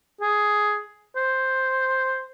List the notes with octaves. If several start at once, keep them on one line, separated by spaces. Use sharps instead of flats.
G#4
C5